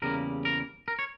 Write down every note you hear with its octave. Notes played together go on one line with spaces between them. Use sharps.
E2 C#3 G3 A#3 A#4
A#4
A#4
C#5